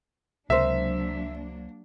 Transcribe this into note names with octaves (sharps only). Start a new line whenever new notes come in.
C#2 C3 F#3 A#3 D4 A#4 C5 E5